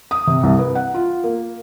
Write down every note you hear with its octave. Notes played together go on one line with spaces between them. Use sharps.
D#6
C3
C2
B4
F#5
F4
A#3